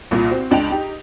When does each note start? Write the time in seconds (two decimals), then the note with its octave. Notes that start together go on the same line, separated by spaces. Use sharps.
0.11 C2 A#2
0.30 C4 F#4
0.51 C#2 D4 D#5 G5 F7
0.70 D#4 G4